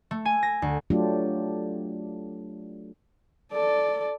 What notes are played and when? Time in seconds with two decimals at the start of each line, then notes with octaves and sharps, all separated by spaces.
0.11 A3
0.25 G#5
0.43 A#6
0.62 D2
0.90 F#3 A3 D4 F4 G4
3.53 A4 D5